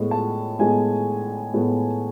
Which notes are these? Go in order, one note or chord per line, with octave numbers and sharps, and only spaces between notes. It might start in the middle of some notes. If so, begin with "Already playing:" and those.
Already playing: A2 G#3 B3
A5
A2 G#3 B3 G#5
A2 G#3 B3